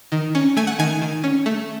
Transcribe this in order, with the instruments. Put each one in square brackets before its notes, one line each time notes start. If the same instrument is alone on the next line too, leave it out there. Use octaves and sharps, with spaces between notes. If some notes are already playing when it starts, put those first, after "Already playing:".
[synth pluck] D#3
C#4
A3 G#5
F#5
D#3 G#5
D#3
C#4
A3